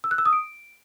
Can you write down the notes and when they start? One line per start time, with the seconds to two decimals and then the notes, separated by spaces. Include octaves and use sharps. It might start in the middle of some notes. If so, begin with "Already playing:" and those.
0.04 E6
0.11 F#6
0.18 E6
0.25 D#6
0.33 D7